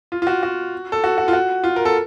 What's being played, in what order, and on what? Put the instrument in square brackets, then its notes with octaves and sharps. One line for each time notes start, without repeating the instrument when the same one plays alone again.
[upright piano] F4
F4
F#4
F#4
A4
F#4
F#4
F4
F#4
F4
A#4
A4